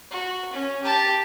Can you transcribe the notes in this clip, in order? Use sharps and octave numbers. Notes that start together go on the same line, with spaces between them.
F#4
C#4
G4 A5